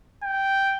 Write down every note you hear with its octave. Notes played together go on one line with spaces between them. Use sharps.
G5